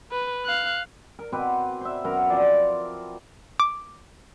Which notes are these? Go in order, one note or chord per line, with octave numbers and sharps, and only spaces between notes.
B4
F5 F#6
A#4
B2 C4 B4 D6
C5 E5
F#2 B3 A#4
F3 C4 F4 D5
D6